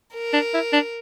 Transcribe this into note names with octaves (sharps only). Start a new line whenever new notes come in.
A#4
D4
E4
D4